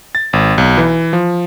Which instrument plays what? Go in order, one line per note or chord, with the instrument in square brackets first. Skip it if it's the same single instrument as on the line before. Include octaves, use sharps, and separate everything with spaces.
[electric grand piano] A6
G#1
B1
E3
F3